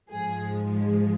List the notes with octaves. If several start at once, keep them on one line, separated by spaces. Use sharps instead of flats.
G#2 F3 G#3 G#4